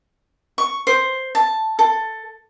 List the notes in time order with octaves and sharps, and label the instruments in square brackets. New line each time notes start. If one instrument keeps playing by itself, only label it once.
[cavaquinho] C#6
C5
A5
A4